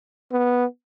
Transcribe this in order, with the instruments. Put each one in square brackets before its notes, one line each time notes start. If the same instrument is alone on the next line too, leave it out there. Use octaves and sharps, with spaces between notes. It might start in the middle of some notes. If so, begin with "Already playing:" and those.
[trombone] B3